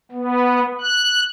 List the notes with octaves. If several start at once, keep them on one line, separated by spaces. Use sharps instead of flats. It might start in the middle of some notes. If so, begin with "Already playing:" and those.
B3
F#6